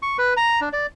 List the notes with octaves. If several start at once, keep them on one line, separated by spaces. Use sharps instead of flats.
C#6
B4
A#5
D4
D5